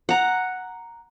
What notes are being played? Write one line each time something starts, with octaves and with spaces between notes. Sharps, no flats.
F#5 A#5